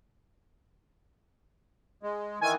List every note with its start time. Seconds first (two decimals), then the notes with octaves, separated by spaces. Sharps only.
2.03 G#3
2.41 D#3 E3 G#5